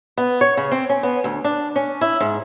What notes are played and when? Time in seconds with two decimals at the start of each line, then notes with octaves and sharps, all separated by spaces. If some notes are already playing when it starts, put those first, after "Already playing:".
0.18 B3
0.41 C#5
0.57 C#3
0.71 C4
0.89 C#4
1.03 B3
1.24 D2
1.44 D4
1.76 C#4
2.01 E4
2.20 G#2